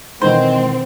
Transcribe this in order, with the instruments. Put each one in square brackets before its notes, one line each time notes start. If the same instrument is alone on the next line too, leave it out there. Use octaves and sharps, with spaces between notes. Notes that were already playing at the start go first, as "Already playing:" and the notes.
[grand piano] B2 D#3 E3 [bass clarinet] G#3 [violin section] C4 [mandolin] C5